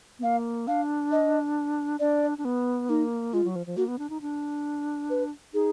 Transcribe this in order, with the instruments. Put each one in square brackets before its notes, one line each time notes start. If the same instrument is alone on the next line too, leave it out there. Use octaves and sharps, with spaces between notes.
[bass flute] B3
[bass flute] A#3 [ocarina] F5
[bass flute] D4 [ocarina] F5
[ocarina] D#5
[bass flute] D4 [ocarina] D5
[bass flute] D4
B3
[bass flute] A#3 [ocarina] D#4
[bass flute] G#3 [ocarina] F4
[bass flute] F#3
F3
F3
[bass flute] A#3 [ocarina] F#4
[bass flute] B3
D4
D#4
D4
[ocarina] B4
[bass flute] D#4 [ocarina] G#4